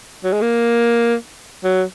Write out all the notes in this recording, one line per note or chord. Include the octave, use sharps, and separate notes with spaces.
F#3
G#3
A#3
F#3